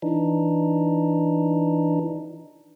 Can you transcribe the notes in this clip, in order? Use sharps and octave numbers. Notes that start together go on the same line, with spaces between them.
E3 D4 D#4